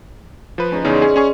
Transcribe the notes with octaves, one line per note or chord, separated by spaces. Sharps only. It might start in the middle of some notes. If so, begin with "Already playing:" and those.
F3 B4
C#4 D#4 G#4
E2 C#3 D#4 D5 C6
C#4 G#4
C#4 G#4 C#6